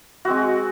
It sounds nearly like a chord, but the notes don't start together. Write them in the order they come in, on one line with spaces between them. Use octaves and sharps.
F#4 C4 G#3